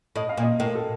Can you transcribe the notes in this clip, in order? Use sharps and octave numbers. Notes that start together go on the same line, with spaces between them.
A2 D#5
F5
A#2
D#5
A2 A#4
A4